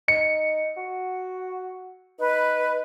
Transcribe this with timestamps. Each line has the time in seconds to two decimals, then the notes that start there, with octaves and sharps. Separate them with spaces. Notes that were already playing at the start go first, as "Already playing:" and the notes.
0.08 D#4 C#7
0.77 F#4
2.20 D#4 B4